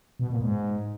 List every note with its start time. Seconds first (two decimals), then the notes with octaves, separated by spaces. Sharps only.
0.19 B2
0.30 A#2
0.41 G#2